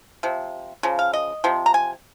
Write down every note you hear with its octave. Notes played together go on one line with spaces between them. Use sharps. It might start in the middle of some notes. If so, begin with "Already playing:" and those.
C3 F3
C#3 F3
F5
D#5
C3 F3 C4
A#5
G#5